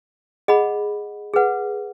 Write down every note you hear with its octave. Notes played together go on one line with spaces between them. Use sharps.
G#4 D#5 F#5 B5
G#4 B4 F#5